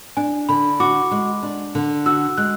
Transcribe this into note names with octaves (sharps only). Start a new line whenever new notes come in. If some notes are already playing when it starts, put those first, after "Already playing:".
D4 G#5
D3 B5
F#4 D6
G#3
D4
D3
F#4 E6
G#3 F#6